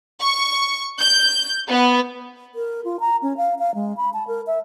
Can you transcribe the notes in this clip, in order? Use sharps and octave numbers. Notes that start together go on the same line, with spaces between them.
C#6
G6
B3
A#4
F4
A#5
C#4
F5
F5
G#3
B5
A5
A#4
E5